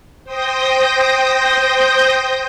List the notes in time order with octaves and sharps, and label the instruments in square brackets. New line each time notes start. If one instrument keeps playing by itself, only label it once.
[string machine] C5 G5 D#6 G6 A#6